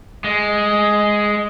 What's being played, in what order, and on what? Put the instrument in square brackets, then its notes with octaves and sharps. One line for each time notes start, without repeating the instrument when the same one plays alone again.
[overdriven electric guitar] G#3